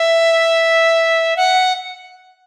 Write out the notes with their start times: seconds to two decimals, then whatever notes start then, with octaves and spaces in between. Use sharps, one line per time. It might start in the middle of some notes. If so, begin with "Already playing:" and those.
Already playing: E5
1.37 F#5